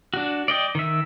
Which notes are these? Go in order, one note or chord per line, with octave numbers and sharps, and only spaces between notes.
D4 F#4
D5 D#5 G5
D#3 E5